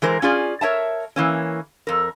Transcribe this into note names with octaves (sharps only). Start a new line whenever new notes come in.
E3 G#3 A#4 C5
C#4 F4 G#4 D5
A#4 C#5 E5 A5
E3 A#3 C#4
F2 A#4